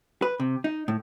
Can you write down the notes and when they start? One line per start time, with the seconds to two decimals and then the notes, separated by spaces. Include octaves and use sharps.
0.22 B4
0.40 C3
0.64 D#4
0.88 A2